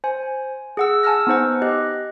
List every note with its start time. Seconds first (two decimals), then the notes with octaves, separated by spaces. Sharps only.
0.04 C5 G#5
0.77 G#4 F#5 E6
1.03 G#5 A5 E6 F6 A#6
1.27 B3 D#4 C5 F#5
1.62 G4 D#5 F#6